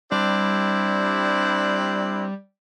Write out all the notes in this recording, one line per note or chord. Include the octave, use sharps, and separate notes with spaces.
G3 C4 D4 E4